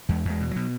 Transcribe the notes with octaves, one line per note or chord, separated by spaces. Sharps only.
E2 G#3
E2 G#3
B2
B2 F#3